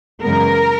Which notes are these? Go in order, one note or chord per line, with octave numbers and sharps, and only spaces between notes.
F#2 C#3 E3 G#3 B3 A#4